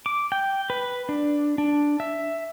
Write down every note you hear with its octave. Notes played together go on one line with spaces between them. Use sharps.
D6
G5
B4
D4
D4
E5